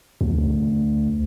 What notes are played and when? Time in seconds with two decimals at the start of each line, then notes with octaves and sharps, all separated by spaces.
0.21 D2